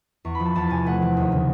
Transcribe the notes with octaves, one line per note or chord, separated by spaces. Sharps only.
E2 C#6
B5
F3
A5
E2 A5
C3 G#5
A3 F#5
E3
D#2
C#3